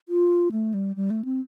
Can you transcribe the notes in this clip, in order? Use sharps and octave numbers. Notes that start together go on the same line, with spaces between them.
F4
A3
G3
G3
A3
C4